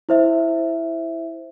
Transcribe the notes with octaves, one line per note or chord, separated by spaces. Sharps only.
E4 C5 E5